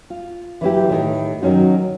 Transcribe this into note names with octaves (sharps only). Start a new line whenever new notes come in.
F4
E3 F#3 E4 G4
A2 D#3
D#3 F#3 C#4 D#4 F#4